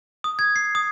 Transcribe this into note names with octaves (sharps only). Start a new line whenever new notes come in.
D#6
G#6
C7
D#6